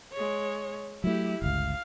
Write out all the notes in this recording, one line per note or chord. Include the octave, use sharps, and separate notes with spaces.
G#3 C#5
F#3 A3 E4 G4
G1 C#2 F5